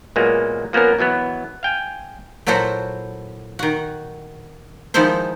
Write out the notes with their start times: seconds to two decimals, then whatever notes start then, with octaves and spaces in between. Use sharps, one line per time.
0.16 A#2 F#3 G#3 A#3 B3
0.73 F3 A#3 B3 C#4 A#4
0.99 B2 E3 F#3 B3
1.63 F5 G5 G#5
2.46 A#2 F#3 E4 F#4 A4 C5
3.59 D#3 F#4
4.94 D#3 F3 G#3 D#4 E4 C5